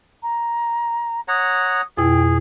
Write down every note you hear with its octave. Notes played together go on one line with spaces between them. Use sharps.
A#5
C#5 F#5 A#5 D#6
F2 B2 E4 G#4 G5